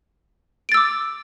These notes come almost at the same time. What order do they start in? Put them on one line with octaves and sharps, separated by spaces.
D7 A6 E6 D6